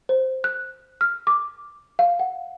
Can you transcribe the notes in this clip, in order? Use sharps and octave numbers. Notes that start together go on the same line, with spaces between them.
C5
F#6
F6
D6
F5
F#5